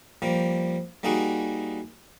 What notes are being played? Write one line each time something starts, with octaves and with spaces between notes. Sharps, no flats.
F3 G3 A#3
G3 A#3 D#4 F#4 G#4